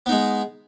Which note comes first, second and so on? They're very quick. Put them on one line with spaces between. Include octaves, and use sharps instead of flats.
B3 D#4 G#3